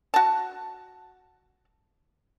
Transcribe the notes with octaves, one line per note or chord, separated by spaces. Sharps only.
F#4 A5